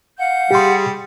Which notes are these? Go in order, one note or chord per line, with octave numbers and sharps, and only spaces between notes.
F5 F#5 G6
G3 G4 G#4 C6